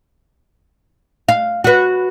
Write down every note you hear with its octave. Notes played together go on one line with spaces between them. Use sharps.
F5
F#4 B4